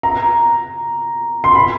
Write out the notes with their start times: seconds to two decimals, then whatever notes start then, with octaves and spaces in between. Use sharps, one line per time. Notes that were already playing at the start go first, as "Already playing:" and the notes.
0.03 A#5
1.44 C6
1.55 B5